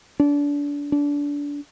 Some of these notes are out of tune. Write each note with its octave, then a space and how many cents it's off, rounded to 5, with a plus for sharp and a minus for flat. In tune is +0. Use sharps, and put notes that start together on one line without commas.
D4 -30
D4 -25